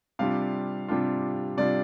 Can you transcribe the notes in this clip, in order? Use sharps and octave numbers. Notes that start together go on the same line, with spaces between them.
C3 G3 D4 F4 F5
C3 G3 D4 F4
C3 G3 D4 F4 D5